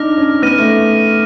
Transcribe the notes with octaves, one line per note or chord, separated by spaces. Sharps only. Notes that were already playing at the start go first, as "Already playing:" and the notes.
Already playing: D4 D#4 D6 F6 A#6
C#4
B3 F6 A#6 D#7
A3